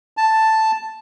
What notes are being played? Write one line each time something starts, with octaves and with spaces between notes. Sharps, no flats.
A5